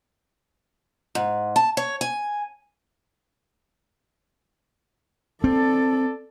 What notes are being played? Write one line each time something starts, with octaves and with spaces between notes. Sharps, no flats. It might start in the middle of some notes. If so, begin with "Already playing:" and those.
G#2
A5
C#5
G#5
C4 A4 D5